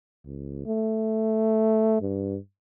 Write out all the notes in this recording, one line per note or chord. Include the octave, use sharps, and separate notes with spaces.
C#2
A3
G2